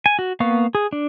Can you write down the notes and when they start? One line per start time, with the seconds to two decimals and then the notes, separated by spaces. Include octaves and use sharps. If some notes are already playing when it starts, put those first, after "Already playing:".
0.06 G#5
0.19 F#4
0.40 A#3 B3 F5 C#6
0.75 G#4
0.93 D4